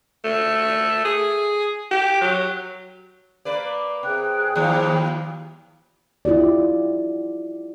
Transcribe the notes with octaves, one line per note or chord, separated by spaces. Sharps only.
A3
G#4
G4
F#3
A#3 B4 D5
C3 G#4 G5 F#6
D#2 F3 G3
E4 F4 G4 D5